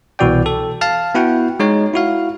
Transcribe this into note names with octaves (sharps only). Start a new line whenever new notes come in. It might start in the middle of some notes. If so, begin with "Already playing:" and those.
C2 B2 E3 F#4 D5 G5
A4
F5 A5 F6
B3 E4 F#4 F#5 G5
G#3 D#4 C#5
E4 F#4 F5